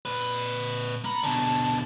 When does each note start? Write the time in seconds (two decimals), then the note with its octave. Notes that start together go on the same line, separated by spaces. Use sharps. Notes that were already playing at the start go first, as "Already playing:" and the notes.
0.05 A#2 B4
1.04 A#3 A#5 B5
1.23 B2 D3 A5